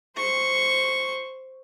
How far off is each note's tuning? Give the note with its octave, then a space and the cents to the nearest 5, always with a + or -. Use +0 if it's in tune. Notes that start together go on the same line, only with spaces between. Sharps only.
C5 +0 C#6 -5